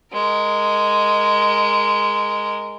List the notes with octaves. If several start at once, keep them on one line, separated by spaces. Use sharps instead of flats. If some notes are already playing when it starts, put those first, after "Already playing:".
G#3 A#4